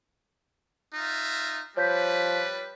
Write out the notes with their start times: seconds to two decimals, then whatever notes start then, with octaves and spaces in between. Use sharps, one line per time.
0.94 D#4 F4 E5
1.77 F3 G3 B4 C#5 G6 B6